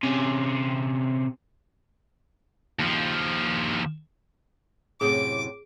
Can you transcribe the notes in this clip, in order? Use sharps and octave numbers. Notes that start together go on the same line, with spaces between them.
C3 C#4
D#2 F3
F#2 A2 C3 G#4 D6